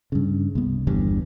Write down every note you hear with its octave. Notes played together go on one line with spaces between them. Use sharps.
G2 C#3
C2 B3
G1 E2 G2